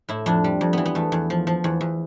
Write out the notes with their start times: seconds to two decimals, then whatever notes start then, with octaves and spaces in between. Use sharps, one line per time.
0.09 A2 E4
0.26 F2 D4
0.44 G3
0.61 F2
0.73 E3 B3
0.86 B3
0.95 E2 A3
1.12 E2
1.30 F3
1.47 F3
1.64 E2
1.81 E2